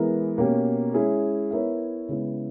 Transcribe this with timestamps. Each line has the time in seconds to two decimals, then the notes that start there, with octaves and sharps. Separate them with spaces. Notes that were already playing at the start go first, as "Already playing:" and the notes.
Already playing: E3 G#3 B3 E4 A#4
0.38 B2 A#3 C#4 G4
0.94 G#3 C#4 E4 G#4
1.51 B3 E4 A#4 C#5 E5
2.09 C#3 G#3 B3 E4